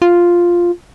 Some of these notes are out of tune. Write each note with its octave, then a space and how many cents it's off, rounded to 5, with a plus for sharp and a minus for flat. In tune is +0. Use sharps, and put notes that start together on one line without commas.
F4 +0